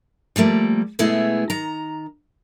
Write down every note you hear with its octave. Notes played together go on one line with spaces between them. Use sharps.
F3 G3 A3 A#3
B2 G#3 A3 B3 E4 G#4
D#3 A#5